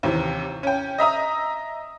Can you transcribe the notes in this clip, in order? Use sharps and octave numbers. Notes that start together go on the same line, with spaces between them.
D#2 C3 E3
C#4 G5
D#5 E5 A#5 D#6